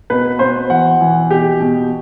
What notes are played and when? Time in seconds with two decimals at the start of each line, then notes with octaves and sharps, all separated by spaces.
0.10 B2 B4
0.39 B2 C5
0.70 E3 F#5
1.01 E3
1.31 B2 G4
1.60 B2